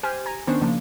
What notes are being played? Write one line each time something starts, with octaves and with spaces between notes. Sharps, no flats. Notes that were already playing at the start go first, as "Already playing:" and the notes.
G4 C5 G#5 F6
G#5 A#5
D#3 B3 C#4 D4 C5 C#6
C#3 F3 A#3 D4